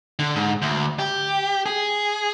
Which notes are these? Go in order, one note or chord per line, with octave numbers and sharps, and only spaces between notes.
D3
G#2
D2
G4
G#4